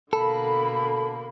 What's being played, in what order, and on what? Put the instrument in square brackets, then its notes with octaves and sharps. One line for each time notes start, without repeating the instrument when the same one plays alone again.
[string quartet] B2 D3 A#3 [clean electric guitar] A4 [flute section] B5